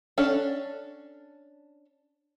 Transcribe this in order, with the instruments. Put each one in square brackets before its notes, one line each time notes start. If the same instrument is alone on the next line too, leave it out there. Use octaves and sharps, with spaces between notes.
[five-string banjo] C#4 D4 A4